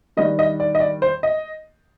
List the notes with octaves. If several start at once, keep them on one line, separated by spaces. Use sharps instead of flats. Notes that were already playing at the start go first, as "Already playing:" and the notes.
D#3 G3 D4 D#5
D#5
D5
D#5
D5
C5
D#5